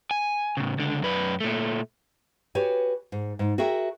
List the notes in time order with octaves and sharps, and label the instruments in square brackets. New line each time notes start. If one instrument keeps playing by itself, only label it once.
[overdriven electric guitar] G#5
A2 C#3
C#2 D3
F#2 B4
A#2 A3
[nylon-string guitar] F#4 G4 B4 C#5 G#5
G#2
G#2
F#4 G#4 A#4 E5 G5